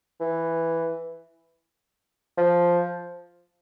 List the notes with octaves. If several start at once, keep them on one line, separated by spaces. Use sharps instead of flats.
E3
F3